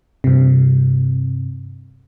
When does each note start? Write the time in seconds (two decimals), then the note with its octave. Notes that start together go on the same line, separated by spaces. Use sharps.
0.24 G2 C3